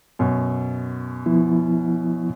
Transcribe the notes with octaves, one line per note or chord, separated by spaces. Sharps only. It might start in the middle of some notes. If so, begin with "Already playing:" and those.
F#2 B2
F3 B3 E4